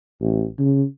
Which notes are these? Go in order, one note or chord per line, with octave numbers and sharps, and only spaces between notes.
A1
C#3